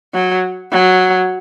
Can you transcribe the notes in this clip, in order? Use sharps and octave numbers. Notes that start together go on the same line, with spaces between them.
F#3
F#3